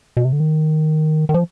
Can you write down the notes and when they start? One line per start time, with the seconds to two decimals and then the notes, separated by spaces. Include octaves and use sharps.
0.17 B2
0.25 C3
0.33 D3
0.40 D#3
1.29 D#3
1.34 F3